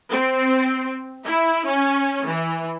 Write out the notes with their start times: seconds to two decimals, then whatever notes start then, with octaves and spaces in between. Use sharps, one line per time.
0.11 C4
1.24 E4
1.65 C#4
2.27 E3